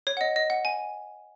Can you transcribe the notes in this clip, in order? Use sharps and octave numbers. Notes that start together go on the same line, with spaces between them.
C#5
F#5
D#5
D#5
F#5
G#5